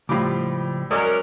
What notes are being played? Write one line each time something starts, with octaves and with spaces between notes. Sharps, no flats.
C#2 A2 F3 G3 D6
F#3 G#3 C#4 A#4 D5 D#6